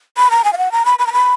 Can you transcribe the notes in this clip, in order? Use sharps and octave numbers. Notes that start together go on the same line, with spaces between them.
B5
A#5
G#5
F5
F#5
A#5
B5
B5
A#5
B5